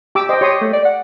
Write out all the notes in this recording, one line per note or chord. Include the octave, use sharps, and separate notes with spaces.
G4 D6 E6
C5 D#5 G5
G4 C#5 C6 D#6
A3
D5
F#5